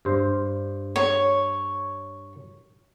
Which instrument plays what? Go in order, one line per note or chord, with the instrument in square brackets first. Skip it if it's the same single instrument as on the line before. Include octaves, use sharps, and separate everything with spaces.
[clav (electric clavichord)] G2 C5
[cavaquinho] C#5